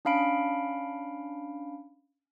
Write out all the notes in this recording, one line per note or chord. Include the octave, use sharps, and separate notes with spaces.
C#4 D4 F5 B5 D7